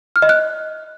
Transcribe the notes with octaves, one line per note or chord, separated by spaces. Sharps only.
F6
D#5
F#6